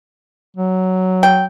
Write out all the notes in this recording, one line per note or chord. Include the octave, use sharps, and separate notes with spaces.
F#3
G5